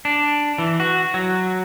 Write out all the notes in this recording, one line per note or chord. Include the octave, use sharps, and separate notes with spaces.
D4
E3
F#4
F#3